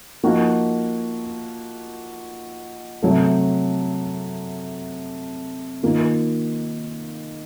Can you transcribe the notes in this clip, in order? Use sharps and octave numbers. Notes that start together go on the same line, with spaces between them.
F3 A#3 D#4 F#4
C3 F#3 A3
D#3 A#3 F4